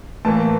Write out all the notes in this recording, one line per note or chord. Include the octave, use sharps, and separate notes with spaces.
A2 E3 A#3 A5